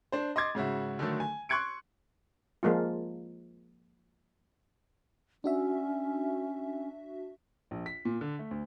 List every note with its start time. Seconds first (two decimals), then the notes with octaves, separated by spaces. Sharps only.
0.12 D4 C5
0.36 D#5 C6 D6 G#6 A6
0.55 G#2 C#3 F#4 E5
0.99 D3 D#3 F#3 A3
1.20 G#5
1.49 C6 C#6 F#6 G#6 C#7 D7
2.63 F3 G#3 A#3 F4
5.44 C#4 D4 F#4 E5
7.71 A#1
7.86 B6
8.05 A#2
8.21 D3
8.39 A3
8.51 D2